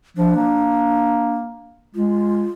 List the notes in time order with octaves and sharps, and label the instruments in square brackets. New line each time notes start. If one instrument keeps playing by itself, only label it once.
[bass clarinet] F3 [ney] D4
[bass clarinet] A#3
[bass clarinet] G#3 [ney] F4